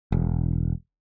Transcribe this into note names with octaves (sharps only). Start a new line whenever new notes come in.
E1